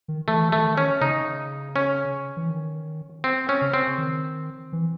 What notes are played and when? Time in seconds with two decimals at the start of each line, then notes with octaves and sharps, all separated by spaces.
0.08 D#3
0.28 E3 A3
0.52 E3 A3
0.64 D#3
0.77 C#4
1.01 C#3 D#4
1.76 C#4
2.37 E3
2.50 D#3
3.24 C4
3.49 C#4
3.61 C#3
3.74 C4
3.98 D#3
4.73 E3